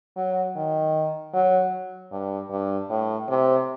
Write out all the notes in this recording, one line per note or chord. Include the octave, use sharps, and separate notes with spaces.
F#3
D#3
F#3
G2
G2
A2
C3